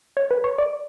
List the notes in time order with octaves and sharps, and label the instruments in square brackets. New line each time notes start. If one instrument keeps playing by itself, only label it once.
[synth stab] C#5
B4
C#5
D5